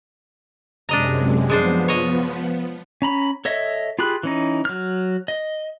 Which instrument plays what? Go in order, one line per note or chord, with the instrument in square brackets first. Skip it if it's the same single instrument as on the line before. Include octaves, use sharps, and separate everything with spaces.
[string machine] F#2 C3 G#3 [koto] D4 D#5 A#5
[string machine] F3 B3 [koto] G#3 D4 C5
[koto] C#5 D#5
[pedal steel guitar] C#4 A#5 B5
A4 C#5 D#5 E5
F4 G4 G#4 B5 F#6
E3 C#4 D#4
F#3 F6
D#5